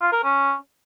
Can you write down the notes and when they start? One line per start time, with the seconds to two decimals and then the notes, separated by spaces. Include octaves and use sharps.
0.01 F4
0.12 A#4
0.24 C#4